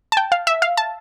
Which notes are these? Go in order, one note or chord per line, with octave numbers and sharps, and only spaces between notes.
A5
G5
F5
E5
F5
A5